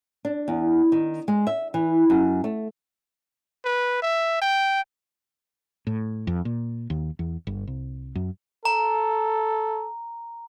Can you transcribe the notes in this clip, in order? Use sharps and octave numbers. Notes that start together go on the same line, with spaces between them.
D4
E2
D#3
G#3
E5
E3
F#2
A3
B4
E5
G5
A2
F2
A#2
D#2
E2
G1
C2
F#2
A4 A#5